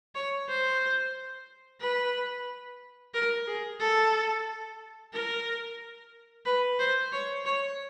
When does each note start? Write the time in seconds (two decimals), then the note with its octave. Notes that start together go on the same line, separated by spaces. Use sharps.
0.15 C#5
0.48 C5
1.81 B4
3.14 A#4
3.47 G#4
3.80 A4
5.14 A#4
6.46 B4
6.79 C5
7.12 C#5
7.45 C#5